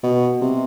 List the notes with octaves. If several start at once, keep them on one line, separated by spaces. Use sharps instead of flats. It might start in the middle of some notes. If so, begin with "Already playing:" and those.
B2
C3